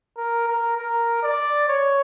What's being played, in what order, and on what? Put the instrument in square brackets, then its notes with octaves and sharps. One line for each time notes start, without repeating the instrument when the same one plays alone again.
[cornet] A#4
A#4
A#4
D5
C#5